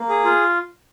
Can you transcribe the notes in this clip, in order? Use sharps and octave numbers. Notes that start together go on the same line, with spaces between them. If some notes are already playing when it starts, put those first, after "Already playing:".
Already playing: A#3
G#4
F4